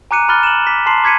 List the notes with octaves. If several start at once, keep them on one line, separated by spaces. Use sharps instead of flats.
G#5 A#5 D6 F#6 C#7 D#7
B5 D6 F6 F#6 A6 G7
E7 F#7
D6 B6
A5 A#5 C6 C7 F#7
D6 G#6 B6 C#7 D#7